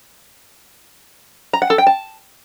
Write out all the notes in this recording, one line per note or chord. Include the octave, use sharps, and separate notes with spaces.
A#5
F#5
A4
G5
A5